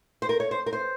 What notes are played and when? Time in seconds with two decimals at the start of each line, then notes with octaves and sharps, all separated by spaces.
0.22 C5
0.29 A#4
0.40 C#5
0.51 C5
0.66 A#4
0.73 C5